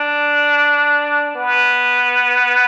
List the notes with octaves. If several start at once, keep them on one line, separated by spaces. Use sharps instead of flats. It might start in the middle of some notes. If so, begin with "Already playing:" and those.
Already playing: D4
B3